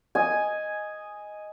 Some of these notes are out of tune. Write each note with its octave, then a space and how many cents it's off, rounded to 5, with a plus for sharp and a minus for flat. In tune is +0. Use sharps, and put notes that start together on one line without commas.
D#5 +0 G#5 +0